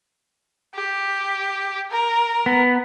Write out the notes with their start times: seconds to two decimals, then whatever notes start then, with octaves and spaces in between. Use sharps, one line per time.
0.75 G4
1.91 A#4
2.46 B3